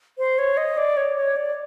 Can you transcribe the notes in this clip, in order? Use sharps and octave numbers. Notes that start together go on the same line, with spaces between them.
C5
C#5
D#5
D5
C#5
C#5
D5